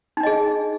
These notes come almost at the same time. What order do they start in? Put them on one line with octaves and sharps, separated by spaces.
D#4 D4 D#5 G#4